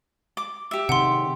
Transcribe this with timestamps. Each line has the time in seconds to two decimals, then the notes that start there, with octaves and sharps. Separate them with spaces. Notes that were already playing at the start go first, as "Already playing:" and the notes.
0.37 D6
0.71 G4 E5
0.89 C3 D#3 F#5 C6